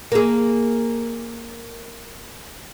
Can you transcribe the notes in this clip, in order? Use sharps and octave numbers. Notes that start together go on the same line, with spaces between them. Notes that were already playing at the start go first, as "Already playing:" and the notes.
A#3 G#4